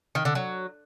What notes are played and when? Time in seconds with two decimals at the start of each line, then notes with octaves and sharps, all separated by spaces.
0.15 D#3
0.25 D3
0.35 F#3